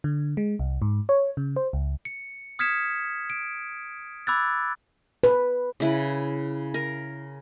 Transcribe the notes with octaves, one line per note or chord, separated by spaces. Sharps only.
D3
G#3
C2
G#2
C#5
C#3
C5
C#2
C#7
D#6 F6 G#6 B6 C#7 E7
D7
B5 D6 E6 F#6 G#6 A6
B4
C#3 E4 B4
A#4